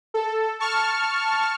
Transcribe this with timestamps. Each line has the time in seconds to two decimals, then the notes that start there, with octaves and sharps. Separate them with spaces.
0.14 A4
0.60 A5 C#6 F6